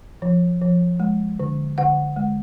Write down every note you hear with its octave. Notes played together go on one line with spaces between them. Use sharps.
F3
F3
G#3
D3
D3 F#5
G#3